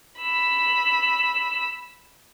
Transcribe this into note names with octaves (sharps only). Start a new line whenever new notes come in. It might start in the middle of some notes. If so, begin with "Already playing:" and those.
B5 E6